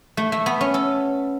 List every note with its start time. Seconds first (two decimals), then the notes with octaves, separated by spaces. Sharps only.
0.17 A3
0.32 A3
0.46 B3
0.61 C#4
0.74 A4